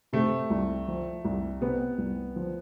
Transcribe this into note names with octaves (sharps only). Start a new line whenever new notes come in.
C3 A3
C2
F3
C2
C3 B3
C2
F3